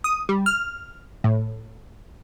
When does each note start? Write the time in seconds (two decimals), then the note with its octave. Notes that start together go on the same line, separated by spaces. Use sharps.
0.04 D#6
0.29 G3
0.46 F6
1.24 A2